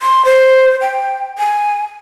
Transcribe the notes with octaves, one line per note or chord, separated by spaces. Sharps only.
C6
C5
G5
G#5